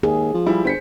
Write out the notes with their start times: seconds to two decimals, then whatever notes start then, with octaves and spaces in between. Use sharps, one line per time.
0.03 D#2 G#4
0.34 F3
0.46 G3 E4
0.65 G1 C5 B6 C#7